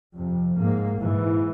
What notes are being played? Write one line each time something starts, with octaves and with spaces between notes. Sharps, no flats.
F2 C3
G#2 A#3
G#2 E3